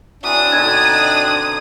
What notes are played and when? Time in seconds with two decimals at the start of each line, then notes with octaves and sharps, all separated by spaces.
0.23 E3 F#3 C4 D4 D#6
0.52 B2 D3 D#4 G#6